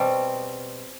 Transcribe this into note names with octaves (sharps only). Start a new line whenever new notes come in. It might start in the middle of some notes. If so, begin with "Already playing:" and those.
Already playing: B2 G3 C4